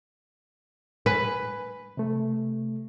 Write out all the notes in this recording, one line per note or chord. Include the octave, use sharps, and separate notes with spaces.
B4 G#5
C3 A3